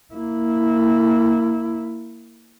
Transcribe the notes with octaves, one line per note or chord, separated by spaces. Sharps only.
A#3 E4